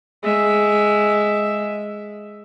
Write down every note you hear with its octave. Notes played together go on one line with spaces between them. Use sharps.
G#3 E5